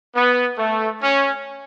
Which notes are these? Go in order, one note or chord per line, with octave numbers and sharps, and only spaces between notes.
B3
A3
C#4